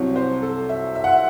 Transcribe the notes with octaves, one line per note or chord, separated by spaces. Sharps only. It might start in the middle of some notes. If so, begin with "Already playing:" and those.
Already playing: C2 C3 F#3 C4 C#5
C5
A4
E5
E5
F#5
E5